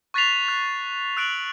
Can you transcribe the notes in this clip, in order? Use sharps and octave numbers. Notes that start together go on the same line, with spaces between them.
C#6 F#6 A6 B6 C7 F7
F#6
E6 F#6 D7 F7 F#7